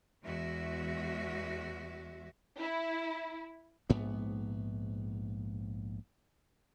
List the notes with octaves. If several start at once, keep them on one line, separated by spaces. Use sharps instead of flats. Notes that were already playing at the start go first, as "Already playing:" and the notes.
E2 G#3 F#4 E5
E4
A#1 G#2 B3